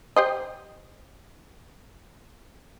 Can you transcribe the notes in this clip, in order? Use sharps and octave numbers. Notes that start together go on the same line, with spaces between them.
G4 C5 D#5